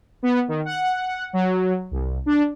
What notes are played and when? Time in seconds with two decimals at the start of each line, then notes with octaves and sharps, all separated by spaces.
0.23 B3
0.48 D#3
0.65 F#5
1.33 F#3
1.91 C2
2.26 D4